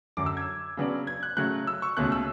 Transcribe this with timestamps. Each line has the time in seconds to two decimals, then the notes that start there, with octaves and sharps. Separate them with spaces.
0.17 F#2 D3 F#3 D6
0.26 E6
0.37 G#6
0.77 C#3 F#3 B3 D4
1.07 G#6
1.23 F#6
1.37 C#3 F#3 A3 F#6
1.67 E6
1.82 C#6
1.97 C#2 B2 A3 C#4 F#6
2.12 E6